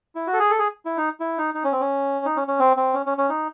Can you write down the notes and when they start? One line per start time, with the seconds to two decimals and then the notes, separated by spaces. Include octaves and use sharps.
0.15 E4
0.27 F#4
0.33 A4
0.39 G#4
0.50 A4
0.59 G#4
0.85 E4
0.97 D#4
1.20 E4
1.38 D#4
1.54 D#4
1.64 C#4
1.72 C4
1.81 C#4
2.25 D#4
2.36 C#4
2.48 C#4
2.59 C4
2.77 C4
2.94 C#4
3.06 C#4
3.18 C#4
3.29 D#4